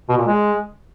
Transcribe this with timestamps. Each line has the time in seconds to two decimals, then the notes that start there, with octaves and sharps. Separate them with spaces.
0.09 B2
0.18 A#2
0.27 G#3